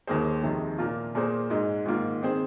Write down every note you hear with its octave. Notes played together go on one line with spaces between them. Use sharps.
D#2 D#3 A#3 G#4 C5
F2 C3 D#3 G#3
A#2 A#3 F4
A#2 A#3 G#4 C5
G#2 G#3 D#4
G#2 D#3 A#3 F4
D#3 C4 G#4 C5